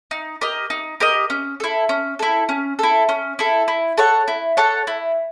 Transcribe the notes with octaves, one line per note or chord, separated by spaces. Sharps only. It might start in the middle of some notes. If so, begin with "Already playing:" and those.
D#4
G4 A#4 D#5
D#4
G4 A#4 D#5
C#4
E4 A4
C#4
E4 A4
C#4
E4 A4
C#4
E4 A4
E4
A4 C#5 F#5
E4
A4 C#5 F#5
E4